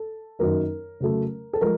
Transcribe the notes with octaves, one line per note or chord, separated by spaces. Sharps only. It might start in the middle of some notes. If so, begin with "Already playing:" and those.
Already playing: A4
F#2 D#3 F#3 A#3 D#4 A#4
C#3 F#3 A3
A4
F3 G#3 A#4